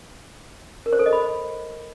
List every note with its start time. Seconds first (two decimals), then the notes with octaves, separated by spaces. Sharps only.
0.86 A#4
0.93 C5
0.99 A4
1.06 D#5
1.13 B5